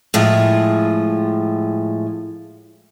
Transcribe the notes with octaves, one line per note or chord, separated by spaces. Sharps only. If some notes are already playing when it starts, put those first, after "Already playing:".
A2 F3 G#3